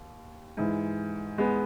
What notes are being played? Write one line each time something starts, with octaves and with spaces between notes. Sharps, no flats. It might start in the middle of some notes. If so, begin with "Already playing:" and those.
Already playing: D#2
G#2 E3
G#3 B3